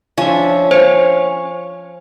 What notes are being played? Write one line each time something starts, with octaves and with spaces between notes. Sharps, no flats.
F3 C#4 D4 E5
C5 C#5 F5